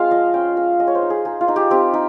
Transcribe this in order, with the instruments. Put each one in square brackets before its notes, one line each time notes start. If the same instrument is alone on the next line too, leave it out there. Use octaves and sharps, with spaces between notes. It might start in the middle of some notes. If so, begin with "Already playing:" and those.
Already playing: [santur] G#3 C4 F4 F5
F3 D#5
C#4 G5
G#3 F5
G#3 D#5
C#5
C5
D#4
G#4
D#4 G#4
F4
D#4
G4
C4 G4
D#4